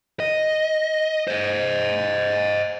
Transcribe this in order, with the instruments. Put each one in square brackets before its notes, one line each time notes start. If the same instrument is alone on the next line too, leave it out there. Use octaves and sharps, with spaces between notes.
[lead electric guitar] D#5
C5 D#5